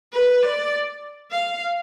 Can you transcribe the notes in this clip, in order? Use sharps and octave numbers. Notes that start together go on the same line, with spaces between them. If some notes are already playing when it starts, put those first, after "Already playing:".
B4
D5
F5